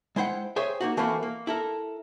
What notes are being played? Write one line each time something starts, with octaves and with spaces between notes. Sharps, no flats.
G#3 E4 C5 F#5 G5
G#4 C5 C#5 E5 G5
A#3 D#4 F#4
E3 A3 A#3 C4 E4 F#4
A#3
E4 A4 A#4